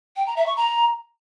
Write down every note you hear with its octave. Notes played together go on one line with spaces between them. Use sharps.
G5
A#5
E5
C#6
A#5